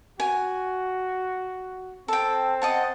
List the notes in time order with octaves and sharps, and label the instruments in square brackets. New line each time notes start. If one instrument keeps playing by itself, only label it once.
[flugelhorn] F#4 [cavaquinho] G#5
[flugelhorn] C4 [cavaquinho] A4 G5
[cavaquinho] D#5 F#5 A5